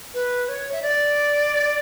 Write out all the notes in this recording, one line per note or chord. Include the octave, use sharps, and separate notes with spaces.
B4
C#5
E5
D5